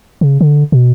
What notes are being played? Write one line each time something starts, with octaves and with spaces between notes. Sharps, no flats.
C#3
D3
B2